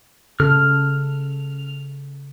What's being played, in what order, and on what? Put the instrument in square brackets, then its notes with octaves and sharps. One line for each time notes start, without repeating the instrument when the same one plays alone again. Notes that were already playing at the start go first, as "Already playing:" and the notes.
[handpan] C#3 A4 [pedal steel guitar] F6